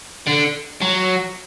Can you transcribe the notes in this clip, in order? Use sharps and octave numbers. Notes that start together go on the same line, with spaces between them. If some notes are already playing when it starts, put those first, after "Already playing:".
D3
F#3